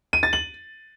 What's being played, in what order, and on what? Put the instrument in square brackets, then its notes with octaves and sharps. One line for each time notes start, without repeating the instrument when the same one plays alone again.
[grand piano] D#7
A6
F#7